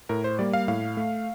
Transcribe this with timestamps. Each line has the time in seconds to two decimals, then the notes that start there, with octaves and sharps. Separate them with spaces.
0.09 A2 A#4
0.24 C5
0.39 G3 A#3 D5
0.53 F5
0.68 A2 F5
0.97 A3